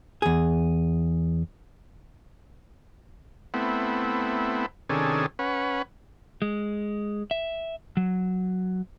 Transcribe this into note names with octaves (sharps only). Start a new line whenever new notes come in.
E2 G#4
A3 B3 C4 E4
C3 D#3 C#4 D4 G#4 A4
C#4 B4 F#5
G#3
E5
F#3